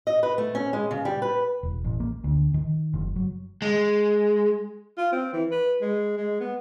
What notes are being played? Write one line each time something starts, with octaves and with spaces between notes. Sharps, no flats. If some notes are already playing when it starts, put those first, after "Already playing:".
D#5
B4
A3
C#4
G#3
C#3
G3
B4
E1
A1
A#3
D2
D#3
F#1
F#3
G#3
F4
C4
E3
B4
G#3
G#3
B3